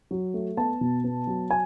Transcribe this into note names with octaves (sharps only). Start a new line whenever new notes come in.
F#3
A3
B3 A5
B2
B3
F#3
G#5